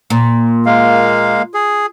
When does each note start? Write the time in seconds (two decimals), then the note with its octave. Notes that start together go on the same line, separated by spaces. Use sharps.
0.10 A#2
0.66 G#3 A#3 F5
1.54 G#4